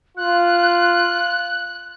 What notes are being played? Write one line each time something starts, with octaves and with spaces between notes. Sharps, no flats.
F4 F#6